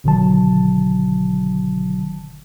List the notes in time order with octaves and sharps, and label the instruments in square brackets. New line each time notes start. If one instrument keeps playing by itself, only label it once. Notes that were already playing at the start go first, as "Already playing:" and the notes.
[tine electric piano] G1 B2 D3 D#3 F#3 A5